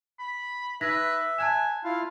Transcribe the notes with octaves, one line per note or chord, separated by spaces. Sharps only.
B5
D#4 B4 E5 A#6 B6
G#5 A5 F#6 E7
E4 F4 F5